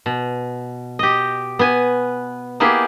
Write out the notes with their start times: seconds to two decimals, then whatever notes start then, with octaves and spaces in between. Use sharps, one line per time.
0.06 B2
0.99 G4 D#5
1.59 B3 B4 G#5
2.60 A#3 B3 E4 G4 G#4